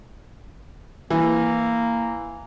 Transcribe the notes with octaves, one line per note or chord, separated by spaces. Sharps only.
E3 A#3